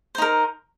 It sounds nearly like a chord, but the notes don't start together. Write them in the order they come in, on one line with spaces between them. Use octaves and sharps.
C5 D#4 A#4